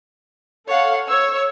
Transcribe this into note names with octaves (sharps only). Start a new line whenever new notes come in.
A4 C#5 F5 F#5
C#5 E6